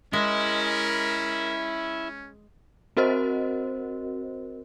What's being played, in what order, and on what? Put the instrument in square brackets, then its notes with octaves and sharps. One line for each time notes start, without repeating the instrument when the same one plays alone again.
[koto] G#3 [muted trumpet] C#4 [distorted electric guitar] E4 [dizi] A#4
[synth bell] C4 F#4 A#4 C5 D#5